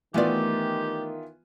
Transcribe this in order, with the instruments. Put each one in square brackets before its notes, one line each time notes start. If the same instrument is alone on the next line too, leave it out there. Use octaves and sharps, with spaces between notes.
[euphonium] D#3 [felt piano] E3 B3 F4 [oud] A3 D5 [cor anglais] G4